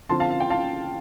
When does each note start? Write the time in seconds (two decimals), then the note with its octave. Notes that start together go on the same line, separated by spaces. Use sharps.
0.09 D3 F3 C4 A5 C6
0.20 F5 A5
0.31 F5
0.40 G5
0.50 F5 A5